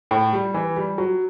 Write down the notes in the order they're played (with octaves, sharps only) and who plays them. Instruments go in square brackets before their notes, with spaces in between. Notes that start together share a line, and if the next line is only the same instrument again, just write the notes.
[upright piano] A2
G3
E3
G3
F#3